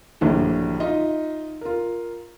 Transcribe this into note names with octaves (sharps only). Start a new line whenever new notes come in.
A#1 G2 D3 E3 F#3
D#4 F4 D#5 E5
F4 A#4